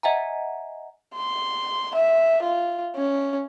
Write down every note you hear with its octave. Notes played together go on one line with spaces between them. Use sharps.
D#5 E5 F#5 G#5 A#5
C6
E5
F4
C#4